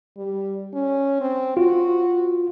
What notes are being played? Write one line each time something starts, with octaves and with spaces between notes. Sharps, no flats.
G3
C#4
C4
F4 F#4